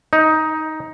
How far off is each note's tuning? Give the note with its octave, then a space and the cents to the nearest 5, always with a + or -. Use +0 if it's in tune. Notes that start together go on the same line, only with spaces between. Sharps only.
D#4 +10